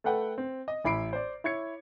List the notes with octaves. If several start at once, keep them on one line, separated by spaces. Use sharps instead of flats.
A3 A4 B4 F#5 G5
C4
D#5
A1 E4 B5 C7 D7
C5 D5
E4 C#5 G#6 C#7